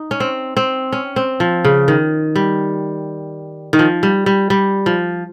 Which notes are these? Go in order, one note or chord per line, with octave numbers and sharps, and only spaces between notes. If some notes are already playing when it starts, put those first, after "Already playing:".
Already playing: D#4
C#4
C4
C4
C#4
C4
F3
C#3
D#3
G3
D#3
F3
G3
G3
G3
F3